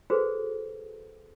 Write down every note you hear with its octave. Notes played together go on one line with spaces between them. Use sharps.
F#4 G#4 A4 B4 C5